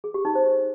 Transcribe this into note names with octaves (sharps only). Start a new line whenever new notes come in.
G#4
G4
D#4
C5